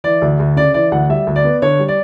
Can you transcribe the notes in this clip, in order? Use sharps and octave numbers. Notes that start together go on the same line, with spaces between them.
E3 D5
D2
D2
C#3 D5
E3 D5
D2 F#5
G3 E5
D2
D5
B3
D3 C#5
G3
D5